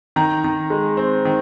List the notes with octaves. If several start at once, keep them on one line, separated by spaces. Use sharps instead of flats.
D#3 A#5
D#3
G#3
C4
D#3